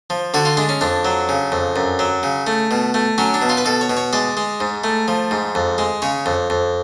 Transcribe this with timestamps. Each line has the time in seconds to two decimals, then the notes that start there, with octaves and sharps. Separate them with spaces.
0.10 F3
0.34 D3 F#4
0.45 F4
0.57 G#3 D4
0.69 C#4
0.81 F2 D4
1.05 F#3
1.29 C#3
1.52 F2
1.76 F#2
1.99 F#3
2.23 C#3
2.47 A3
2.71 B2
2.94 A3
3.18 F#3 C#4
3.34 D4
3.42 B2
3.49 F4
3.57 B4
3.65 B2 A4
3.81 C#5
3.89 B2
3.97 C#5
4.13 G#3 D5
4.37 G#3
4.60 G#2
4.84 A3
5.08 F3
5.31 G#2
5.55 F2
5.78 G#3
6.02 C#3 C#5
6.26 F2
6.50 F2